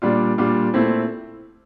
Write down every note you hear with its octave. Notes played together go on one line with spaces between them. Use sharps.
A#2 G3 D4 F4
A#2 G3 D4 F4
A#2 A3 C4 E4